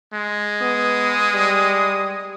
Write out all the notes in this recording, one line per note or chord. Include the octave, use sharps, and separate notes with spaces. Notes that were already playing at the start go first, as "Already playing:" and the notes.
G#3
B3 D#6
G3